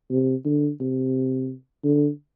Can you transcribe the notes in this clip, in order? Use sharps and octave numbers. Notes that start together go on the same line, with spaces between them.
C3
D3
C3
D3